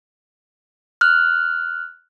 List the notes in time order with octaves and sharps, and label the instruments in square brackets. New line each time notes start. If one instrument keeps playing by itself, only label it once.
[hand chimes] F6 F#6